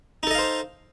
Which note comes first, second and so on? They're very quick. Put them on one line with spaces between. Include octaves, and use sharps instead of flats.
D#4 A4 D#5 F5 C5